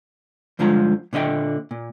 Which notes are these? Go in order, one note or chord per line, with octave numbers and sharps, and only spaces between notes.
G2 D3 F3 G#3 F4 A#5
A#2 D3 D#5 E5 G5
A#2